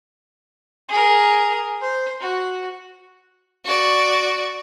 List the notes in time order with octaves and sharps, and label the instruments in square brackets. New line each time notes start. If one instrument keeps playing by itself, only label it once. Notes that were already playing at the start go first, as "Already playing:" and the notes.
[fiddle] G#4 A#4
C5
F#4
[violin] F#4 D5